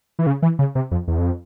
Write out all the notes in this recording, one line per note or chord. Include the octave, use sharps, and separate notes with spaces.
E3
C#3
E3
C#3
C3
F2
E2
F2